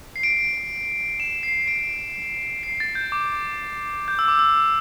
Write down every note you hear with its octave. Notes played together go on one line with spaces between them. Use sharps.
C7
D7
E7
C7
D7
C7
A6
G6
D6
G6
E6
D6
E6